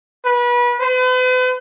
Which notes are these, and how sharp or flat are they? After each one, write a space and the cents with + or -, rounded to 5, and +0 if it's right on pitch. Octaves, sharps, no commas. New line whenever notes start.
B4 -30
B4 +45